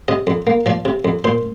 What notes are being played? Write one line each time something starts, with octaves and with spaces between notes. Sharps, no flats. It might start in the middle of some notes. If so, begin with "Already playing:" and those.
C3 D#5
F2
A#3
F3 D5
C3
F2
A#2 C5